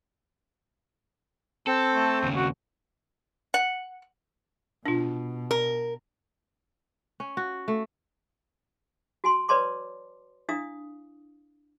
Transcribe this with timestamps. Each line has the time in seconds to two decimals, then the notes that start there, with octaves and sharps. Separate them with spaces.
1.67 C4 A4
1.94 A3
2.23 D#2 C#3
2.35 F#4
3.54 F#5
4.86 B2 D4 F4
5.51 A#4
7.20 C#4
7.37 F#4
7.68 A3
9.24 F#4 G#5 C6
9.49 B4 C#5 D5 A5 C6 D6
10.49 D4 E4 F5 D#6